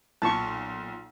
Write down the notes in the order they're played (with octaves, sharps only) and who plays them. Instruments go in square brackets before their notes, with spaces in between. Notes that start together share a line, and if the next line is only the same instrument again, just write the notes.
[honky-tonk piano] B1 A#2 [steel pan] A5 C#6